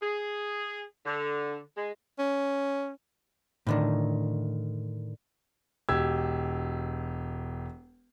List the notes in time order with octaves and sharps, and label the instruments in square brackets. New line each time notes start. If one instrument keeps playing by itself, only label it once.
[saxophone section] G#4
D3
G#3
[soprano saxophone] C#4
[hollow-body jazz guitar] A2 D3 D#3
[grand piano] E1 G4 E6 G#6